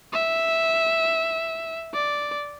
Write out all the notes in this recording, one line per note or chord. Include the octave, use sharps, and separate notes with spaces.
E5
D5